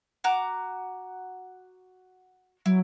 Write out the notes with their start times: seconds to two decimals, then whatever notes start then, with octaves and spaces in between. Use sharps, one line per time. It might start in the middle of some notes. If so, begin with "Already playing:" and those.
0.24 F#4 A#5 D6
2.66 F#3 E4